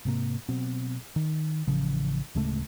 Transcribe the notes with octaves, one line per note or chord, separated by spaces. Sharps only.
G#2 C3 A#3
B2 F#3 B3 C4
D#3
A1 C#3 E3 F3
D1 C#3 G#3 A3